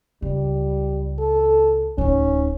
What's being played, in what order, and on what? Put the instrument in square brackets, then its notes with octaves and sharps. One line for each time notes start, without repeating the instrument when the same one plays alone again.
[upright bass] C#2 [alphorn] G3
[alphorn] A4
[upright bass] D1 D#4 [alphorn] C#4